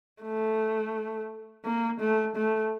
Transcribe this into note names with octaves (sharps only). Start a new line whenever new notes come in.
A3
A#3
A3
A3